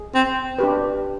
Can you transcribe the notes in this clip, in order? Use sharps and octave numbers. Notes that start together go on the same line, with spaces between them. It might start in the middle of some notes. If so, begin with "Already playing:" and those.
Already playing: G#4
C4
D4 G4 B4